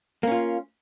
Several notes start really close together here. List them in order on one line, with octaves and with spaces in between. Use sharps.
A#3 C#4 F4